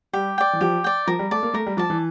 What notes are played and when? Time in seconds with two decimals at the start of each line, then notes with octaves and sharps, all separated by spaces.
0.13 G3 G4
0.38 D5 G5
0.53 E3
0.61 F3 G4
0.84 D5 G5
1.07 F3 A#4
1.19 G3
1.31 A3 D5 A5
1.43 A#3
1.54 A3 A#4
1.67 G3
1.77 F3 D5 A5
1.90 E3